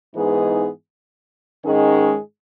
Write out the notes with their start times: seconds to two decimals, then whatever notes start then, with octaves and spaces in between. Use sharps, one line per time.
0.16 G#2 E3 B3 D#4 G#4
1.65 G#2 D#3 G#3 C#4 G#4